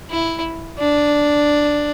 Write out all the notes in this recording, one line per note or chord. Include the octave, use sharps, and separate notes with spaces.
E4
D4